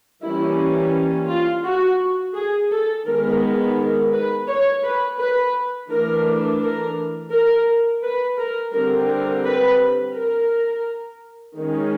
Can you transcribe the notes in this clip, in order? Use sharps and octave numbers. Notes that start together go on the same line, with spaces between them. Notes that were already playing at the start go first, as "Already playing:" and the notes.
E3 G3 A#3 C#4 E4
F4
F#4
G#4
A4
D#3 G#3 B3 A#4
A#4
B4
C#5
B4
B4
E3 A3 D4 A#4
A#4
A#4
B4
A#4
D3 G3 C4 A#4
A#4
B4
A#4
D#3 G#3 C#4